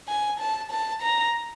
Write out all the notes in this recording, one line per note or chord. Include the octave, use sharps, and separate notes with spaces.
G#5
A5
A5
A#5